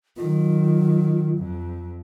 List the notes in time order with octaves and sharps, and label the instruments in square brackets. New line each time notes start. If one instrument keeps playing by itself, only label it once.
[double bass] D#3 F#3 [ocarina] F4
[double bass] F2